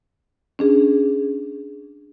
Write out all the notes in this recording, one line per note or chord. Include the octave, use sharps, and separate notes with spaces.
C#4 D4 G#4